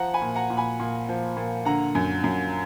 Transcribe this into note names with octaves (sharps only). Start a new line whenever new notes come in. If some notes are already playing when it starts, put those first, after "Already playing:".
Already playing: F3 F#5 A#5
G#5 B5
A#2
F#5 A#5
A#2
G#5 B5
A#2
F3
A#2
D3 F#5 A#5
F#2
F#2